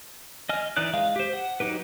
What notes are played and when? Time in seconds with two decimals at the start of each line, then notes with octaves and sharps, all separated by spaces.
0.49 D#5 G#5 F6
0.77 E3 D#4 D5 F#6
0.94 G#3 F5
1.16 G4 C5
1.33 F#5
1.60 F#3 D#4 G4 B4